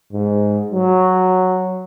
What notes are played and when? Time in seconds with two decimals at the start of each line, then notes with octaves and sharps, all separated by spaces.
0.13 G#2
0.72 F#3